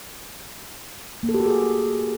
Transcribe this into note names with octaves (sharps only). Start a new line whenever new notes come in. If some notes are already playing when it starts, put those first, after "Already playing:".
A#3
A4
G4
F#4
G#4